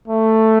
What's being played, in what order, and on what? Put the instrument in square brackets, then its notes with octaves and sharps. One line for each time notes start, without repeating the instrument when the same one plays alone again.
[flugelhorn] A3